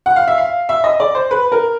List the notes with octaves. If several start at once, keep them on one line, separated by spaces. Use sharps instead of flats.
F#5
F5
E5
F5
E5
D#5
D5
C5
B4
A#4